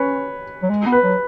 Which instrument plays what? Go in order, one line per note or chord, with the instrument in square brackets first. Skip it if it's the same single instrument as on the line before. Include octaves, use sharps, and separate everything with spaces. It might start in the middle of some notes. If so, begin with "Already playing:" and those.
Already playing: [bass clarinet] C#4 [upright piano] B4 C#5
[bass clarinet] F#3
G#3
B3
[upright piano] B4
[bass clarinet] F#3